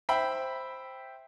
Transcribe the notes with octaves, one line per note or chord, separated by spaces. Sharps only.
C5 E5 G5 B5